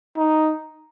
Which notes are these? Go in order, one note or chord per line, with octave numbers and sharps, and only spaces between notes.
D#4